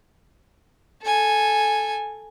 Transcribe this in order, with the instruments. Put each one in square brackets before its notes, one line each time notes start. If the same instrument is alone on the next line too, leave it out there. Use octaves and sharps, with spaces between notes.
[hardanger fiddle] A4 G#5